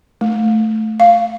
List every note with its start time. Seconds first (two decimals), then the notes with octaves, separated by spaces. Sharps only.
0.21 A3
1.00 F5